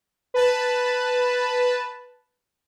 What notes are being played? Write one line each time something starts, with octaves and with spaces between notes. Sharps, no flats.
B4 A5